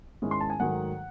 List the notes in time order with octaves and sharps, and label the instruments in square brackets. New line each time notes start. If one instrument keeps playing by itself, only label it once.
[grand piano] G#2 D#3 G#3 C#4 E4
C6
A5
G#5
G#2 D#3 F#3 A3 F#5